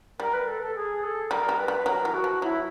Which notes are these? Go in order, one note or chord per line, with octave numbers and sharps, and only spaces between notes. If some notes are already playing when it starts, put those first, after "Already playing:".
G3 A#4
B4
A4
A4
G#4
A4
G3 A#4
G3
B4
G3
F#3 A#4
E3
F#4
F3
F#3 E4